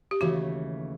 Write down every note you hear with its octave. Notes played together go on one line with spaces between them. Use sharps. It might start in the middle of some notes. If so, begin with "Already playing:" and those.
G4
D#2 C#3 E3 A3 F#4